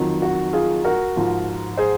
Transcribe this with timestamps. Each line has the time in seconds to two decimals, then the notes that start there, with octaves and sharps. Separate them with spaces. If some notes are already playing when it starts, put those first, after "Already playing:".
Already playing: F2 D#3 F#3
0.22 F#4
0.53 F4 G#4
0.84 F#4 A#4
1.16 G#2 F3
1.77 G#4 C5